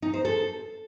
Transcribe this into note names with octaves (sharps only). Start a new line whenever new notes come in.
D#4
C5
A4